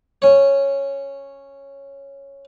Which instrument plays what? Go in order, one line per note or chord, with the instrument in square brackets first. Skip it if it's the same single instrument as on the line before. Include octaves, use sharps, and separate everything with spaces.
[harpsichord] C#4 C#5